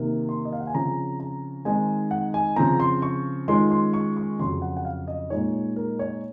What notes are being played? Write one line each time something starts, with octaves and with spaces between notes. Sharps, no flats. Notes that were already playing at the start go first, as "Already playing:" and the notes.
Already playing: C3 D#3 A#3
C6
D#5
F5
F#5
G#5
C#3 F3 C4 A#5
A#5
D#3 G#3 C4 D#4 G#5
F#5
G#5
C#3 F3 C4 A#5
C6
C#6
D#3 G#3 C#4 F4 C6
C6
C#6
C#6
F2 C#3 F#3 C6
F#5
F#5
F5
D#5
A#2 G#3 D#4 C#5
A#4
C#5